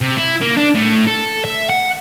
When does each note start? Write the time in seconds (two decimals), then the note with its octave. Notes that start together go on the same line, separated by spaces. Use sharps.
0.01 C3
0.17 E4
0.42 A#3
0.57 D4
0.75 A2
1.07 A4
1.45 E5
1.70 F#5